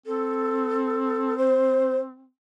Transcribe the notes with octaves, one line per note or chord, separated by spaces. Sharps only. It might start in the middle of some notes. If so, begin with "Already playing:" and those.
C4 A4
C5